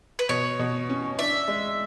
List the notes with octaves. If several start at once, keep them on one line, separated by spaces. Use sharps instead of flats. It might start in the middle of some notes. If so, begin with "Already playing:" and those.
B4
B2 C#5
B2
C#4
D4 E5
G#3